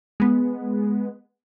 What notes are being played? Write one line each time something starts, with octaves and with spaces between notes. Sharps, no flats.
G#3 B3